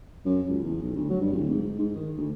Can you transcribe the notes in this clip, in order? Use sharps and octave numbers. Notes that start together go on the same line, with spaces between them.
F#2
C#2
E2
B1
D2
F#3
G2
D1
G#2
G#2
D#3
D2